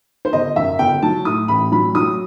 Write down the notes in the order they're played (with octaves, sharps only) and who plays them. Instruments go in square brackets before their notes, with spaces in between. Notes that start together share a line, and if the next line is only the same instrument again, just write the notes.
[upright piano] C5
G1 D#5
F#2 E5
G1 G5
F#3 A5
A2 D#6
A1 B5
F#3 B5
F#3 D#6